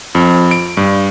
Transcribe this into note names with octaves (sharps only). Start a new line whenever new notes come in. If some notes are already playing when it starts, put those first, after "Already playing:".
F2
D7
G2